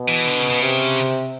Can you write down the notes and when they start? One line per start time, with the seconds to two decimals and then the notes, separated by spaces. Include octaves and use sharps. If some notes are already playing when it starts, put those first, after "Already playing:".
Already playing: B2
0.08 E3
0.27 D3
0.39 C#3
0.50 C#3
0.62 C3